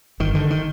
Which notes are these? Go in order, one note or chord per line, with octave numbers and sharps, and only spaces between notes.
G1 D#3
D3 D#3
D#3